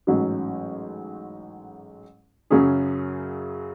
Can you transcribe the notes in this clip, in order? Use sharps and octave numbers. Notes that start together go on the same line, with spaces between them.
A1 G#2 F#3 C#4 F#4
F#2 C#3 F#3 C#4 G#4